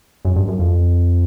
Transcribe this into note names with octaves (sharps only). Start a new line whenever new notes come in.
F#2
G2
F#2
F2